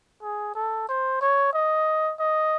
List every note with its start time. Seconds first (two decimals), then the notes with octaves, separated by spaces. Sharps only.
0.22 G#4
0.55 A4
0.88 C5
1.21 C#5
1.53 D#5
2.20 D#5